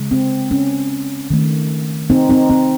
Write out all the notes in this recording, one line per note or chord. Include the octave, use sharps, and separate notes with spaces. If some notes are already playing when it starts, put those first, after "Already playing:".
Already playing: C#3 G#3
C4
C#4
D#3 A3
C4 D#4
C4 D#4
C4